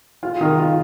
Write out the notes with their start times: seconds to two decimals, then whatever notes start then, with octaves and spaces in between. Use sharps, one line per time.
0.23 F4
0.41 D#3
0.59 F4